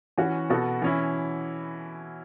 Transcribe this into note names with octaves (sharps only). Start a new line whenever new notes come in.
E3 C#4 F#4
B2 B3 F#4 A4
E3 C#4 E4